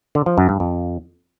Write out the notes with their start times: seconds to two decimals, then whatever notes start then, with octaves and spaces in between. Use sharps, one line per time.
0.15 D3
0.26 F3
0.38 F#2
0.49 G2
0.60 F2